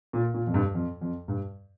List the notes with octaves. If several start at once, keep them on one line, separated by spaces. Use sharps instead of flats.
A#2
A#2
F2
G2
F2
F2
G2